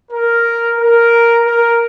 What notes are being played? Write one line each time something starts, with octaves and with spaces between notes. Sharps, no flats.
A#4
A#4
A#4